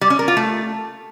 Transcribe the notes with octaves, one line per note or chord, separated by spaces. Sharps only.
G3
C#4
A#4
F4
A3